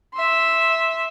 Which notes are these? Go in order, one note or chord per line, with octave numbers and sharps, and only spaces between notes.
E5 C6